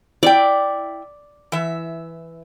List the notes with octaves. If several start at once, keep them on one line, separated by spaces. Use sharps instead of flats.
E4 D5 G5
E3 E5